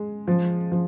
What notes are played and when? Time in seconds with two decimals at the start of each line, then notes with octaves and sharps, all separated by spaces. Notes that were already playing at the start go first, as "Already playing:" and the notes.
Already playing: G#3
0.28 F3
0.72 F3